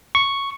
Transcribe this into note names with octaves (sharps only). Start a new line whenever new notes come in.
C#6